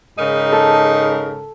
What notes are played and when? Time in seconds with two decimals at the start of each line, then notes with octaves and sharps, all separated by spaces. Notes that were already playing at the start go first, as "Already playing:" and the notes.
0.18 G#2 C#3 D#4 A#4
0.52 A4